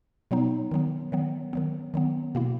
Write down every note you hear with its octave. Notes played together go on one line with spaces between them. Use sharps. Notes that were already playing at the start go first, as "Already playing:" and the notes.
B2 F#3 B3 D#4
D#3 F#3 B3
D#3 F#3 B3
D#3 F#3 B3
D#3 F#3 B3
B2 A#3 E4